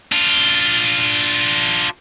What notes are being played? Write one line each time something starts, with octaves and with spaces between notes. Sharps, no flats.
D4 F4